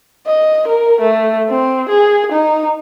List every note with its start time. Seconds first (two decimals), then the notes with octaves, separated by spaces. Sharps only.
0.27 D#5
0.67 A#4
1.01 A3
1.50 C4
1.89 G#4
2.32 D#4